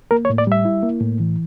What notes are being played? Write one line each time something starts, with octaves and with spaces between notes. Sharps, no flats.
A#3 A#4
C#5
A2
D5
G3 E5
E4
A#3
A2
E3